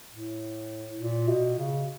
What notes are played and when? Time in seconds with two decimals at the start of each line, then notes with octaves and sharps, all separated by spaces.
0.13 A2
1.00 A#2
1.28 B2
1.58 C#3